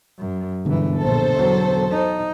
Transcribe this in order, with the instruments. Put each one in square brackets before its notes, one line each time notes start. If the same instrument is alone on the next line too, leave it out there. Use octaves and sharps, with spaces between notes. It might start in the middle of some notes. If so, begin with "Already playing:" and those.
[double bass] F#2
[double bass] G1 E3 [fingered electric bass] B2 D3 B3
[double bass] A#1 [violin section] A4 C5
[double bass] E2 F#3
D#4